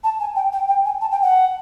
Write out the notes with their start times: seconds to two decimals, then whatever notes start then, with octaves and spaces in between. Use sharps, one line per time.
0.03 A5
0.20 G#5
0.35 G5
0.52 G5
0.68 G5
0.84 G#5
1.01 A5
1.11 G5
1.22 F#5